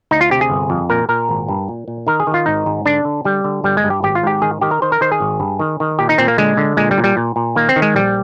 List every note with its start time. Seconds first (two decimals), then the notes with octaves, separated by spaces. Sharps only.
0.11 D2 D#4
0.21 F4
0.31 C3 G4
0.41 G#4
0.50 G1
0.70 F2
0.90 A#2 A#4
1.09 A#2 A#4
1.29 G#1
1.49 G2
1.69 A#2
1.88 A#2
2.07 D#3 A#4
2.20 G#4
2.27 D#3
2.34 F4
2.46 G#1 D#4
2.66 G#2
2.86 D3 D4
3.05 D3
3.25 D3 G3
3.44 D3
3.64 G1 G3
3.77 G#3
3.84 G2
3.90 G4
4.03 G#1 G4
4.15 F4
4.23 G#2 G4
4.42 D#3 G#4
4.61 D#3 G4
4.71 A#4
4.82 D#3 C5
4.92 A#4
5.01 D#3 C5
5.12 G#4
5.20 G#1
5.40 G2
5.59 D#3
5.80 D#3
5.99 A#2 G4
6.09 D#4
6.18 A#2 C4
6.28 A#3
6.38 D3 G#3
6.57 D3
6.77 A#2 G#3
6.91 G3
6.98 A#2
7.04 G3
7.17 A#2
7.36 A#2
7.55 D#3 A#3
7.69 C4
7.76 D#3
7.82 G#3
7.95 A#1 G3